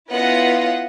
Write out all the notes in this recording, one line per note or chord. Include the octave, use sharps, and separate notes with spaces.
B3 C#4 E4 F4 D#5 F#5